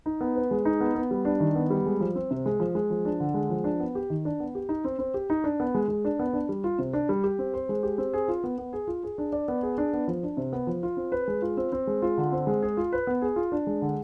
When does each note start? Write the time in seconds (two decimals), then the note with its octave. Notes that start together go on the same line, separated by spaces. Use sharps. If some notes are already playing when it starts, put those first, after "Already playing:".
0.06 D#4
0.21 B3
0.36 B4
0.51 G#3
0.65 D#4
0.81 B3
0.95 B3
1.11 G3
1.25 D4
1.40 D#3
1.55 B3
1.70 G3
1.86 G#3
2.00 F3
2.15 C4
2.31 C3
2.46 G#3
2.60 F3
2.75 G#3
2.90 F3
3.05 D4
3.20 D3
3.34 G#3
3.50 F3
3.64 D4
3.80 B3
3.95 G4
4.10 D#3
4.25 D4
4.40 B3
4.55 G4
4.69 D#4
4.84 C4
4.99 C4
5.14 G4
5.30 D#4
5.44 D4
5.60 B3
5.75 G#3
5.88 G#3
6.05 D4
6.19 B3
6.33 D4
6.49 G3
6.64 F4
6.79 C3
6.93 D4
7.09 G3
7.24 G4
7.39 C4
7.54 C5
7.69 G#3
7.83 G4
7.98 C4
8.13 G#4
8.28 F4
8.44 B3
8.58 B3
8.73 G#4
8.88 F4
9.03 G#4
9.18 D4
9.33 D5
9.48 B3
9.62 G#4
9.78 D4
9.93 B3
10.08 F3
10.23 D4
10.37 C3
10.53 B3
10.67 F3
10.83 F4
10.97 C4
11.12 B4
11.28 G#3
11.42 F4
11.57 C4
11.72 C4
11.87 G#3
12.02 F4
12.18 D3
12.32 C4
12.47 G#3
12.62 G#4
12.77 F4
12.92 B4
13.07 B3
13.22 G#4
13.36 F4
13.52 D4
13.67 G#3
13.82 D3